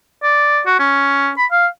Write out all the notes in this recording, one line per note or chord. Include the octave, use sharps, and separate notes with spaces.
D5
F#4
C#4
B5
F5